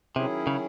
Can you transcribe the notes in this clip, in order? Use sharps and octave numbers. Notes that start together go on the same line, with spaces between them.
C3 D#3 F#3 C#4 E4 G#4
C#3